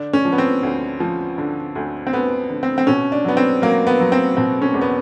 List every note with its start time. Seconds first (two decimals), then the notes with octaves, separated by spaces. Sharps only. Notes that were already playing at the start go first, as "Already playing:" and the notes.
Already playing: D3 D4
0.13 C#4
0.25 F3
0.32 B3
0.38 C4
0.63 D2
1.00 F3
1.38 D3
1.76 D2
2.07 C4
2.13 D2 B3
2.50 D3
2.63 C4
2.78 C4
2.87 B2 C#4
3.12 D4
3.25 F#3 B3
3.37 C4
3.62 F#3 A#3
3.87 B3
4.00 F#3
4.12 C4
4.37 B2 C4
4.62 C#4
4.74 E2
4.81 B3